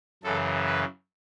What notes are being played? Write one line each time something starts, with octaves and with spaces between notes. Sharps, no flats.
F#2 C#3 E3 A4
B4